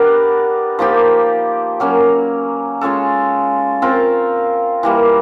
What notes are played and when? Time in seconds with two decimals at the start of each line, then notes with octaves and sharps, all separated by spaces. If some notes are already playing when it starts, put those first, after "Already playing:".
Already playing: B3 D4 G4 A#4
0.79 F3 A#3 D#4 G4
1.80 F#3 A#3 C#4
2.81 G#3 C#4 F4 A4
3.82 C4 F4 A#4
4.83 E3 G3 A#3